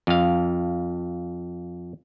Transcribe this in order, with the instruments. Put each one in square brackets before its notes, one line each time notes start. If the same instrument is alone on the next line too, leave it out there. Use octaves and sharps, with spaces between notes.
[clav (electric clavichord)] F2 F5